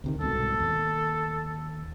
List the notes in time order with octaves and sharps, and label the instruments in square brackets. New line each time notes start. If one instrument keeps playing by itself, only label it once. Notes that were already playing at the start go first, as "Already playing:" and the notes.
[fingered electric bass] D2 C3 D#3
[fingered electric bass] C2 G#2 B2 [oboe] A4
[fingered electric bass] D#2